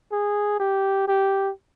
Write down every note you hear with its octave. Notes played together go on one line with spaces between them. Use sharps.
G#4
G4
G4